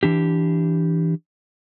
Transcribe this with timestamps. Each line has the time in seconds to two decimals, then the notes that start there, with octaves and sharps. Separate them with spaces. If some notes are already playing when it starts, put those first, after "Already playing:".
0.03 E3 D4 G4